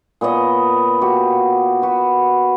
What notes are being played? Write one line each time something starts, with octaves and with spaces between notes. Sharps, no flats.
A#2 B3 C#5 D#5
F#4 G4
F#4 B4